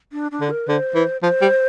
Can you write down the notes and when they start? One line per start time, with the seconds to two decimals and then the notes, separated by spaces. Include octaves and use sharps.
0.12 D4
0.32 D4
0.41 D3
0.50 A#4
0.68 D3 C5
0.95 E3
1.23 F3 C5
1.42 G3